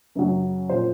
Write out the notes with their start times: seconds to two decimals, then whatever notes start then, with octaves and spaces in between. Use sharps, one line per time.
0.15 F#2 C#3 F#3
0.69 A#2 F3 C5